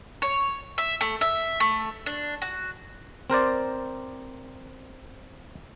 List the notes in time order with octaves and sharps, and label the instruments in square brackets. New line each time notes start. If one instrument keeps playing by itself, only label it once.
[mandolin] C#5
E5
A3
E5
A3
D4
F#4
[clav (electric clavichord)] C4 A#4 C5 D5